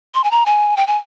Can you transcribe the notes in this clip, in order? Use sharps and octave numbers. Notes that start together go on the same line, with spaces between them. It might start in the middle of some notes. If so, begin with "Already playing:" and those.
C6
G#5
A#5
G#5
G5
G#5